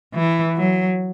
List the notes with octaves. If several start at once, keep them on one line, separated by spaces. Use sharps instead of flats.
E3
F#3